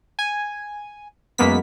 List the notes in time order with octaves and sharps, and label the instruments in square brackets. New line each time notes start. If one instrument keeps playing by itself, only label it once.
[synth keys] G#5
F#2 G#3 A#3 B3 B6